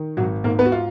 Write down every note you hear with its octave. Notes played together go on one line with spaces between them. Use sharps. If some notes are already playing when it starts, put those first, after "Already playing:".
Already playing: D#3
G#1 F#3 F#4
G#2 A#3 A#4
B3 B4
F#4
F4